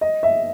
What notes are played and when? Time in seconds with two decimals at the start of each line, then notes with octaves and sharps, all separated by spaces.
0.01 D#5
0.23 E5